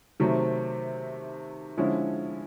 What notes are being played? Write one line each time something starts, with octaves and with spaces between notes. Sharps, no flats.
C3 D#3 F#3 A3 C4
D3 F3 G#3 C#4 E4